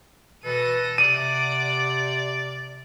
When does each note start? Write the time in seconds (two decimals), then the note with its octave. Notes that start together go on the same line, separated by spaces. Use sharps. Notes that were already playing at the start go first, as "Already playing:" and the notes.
0.44 B2 E3 A4 B4 A#6 D#7
0.98 C3 D5 F#5 D6 D#7